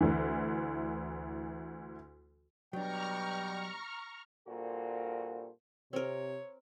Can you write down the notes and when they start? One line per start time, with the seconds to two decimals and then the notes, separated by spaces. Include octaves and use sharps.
0.01 D2 E3
2.73 B2 F#3 G3 D4 G5 A#5 C#6 F6
4.48 G2 A#2 A#3 F#4 A4 C5
5.93 C3 C4 A#4 C#5